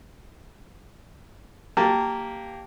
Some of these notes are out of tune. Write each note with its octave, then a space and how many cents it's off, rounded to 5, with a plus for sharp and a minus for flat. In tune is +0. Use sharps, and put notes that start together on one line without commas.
A#3 -10 G4 +0 A5 +0